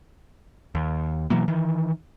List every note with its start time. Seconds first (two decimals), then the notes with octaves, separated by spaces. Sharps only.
0.75 D#2
1.30 B2 E3 F#3 A#3
1.48 D#3 E3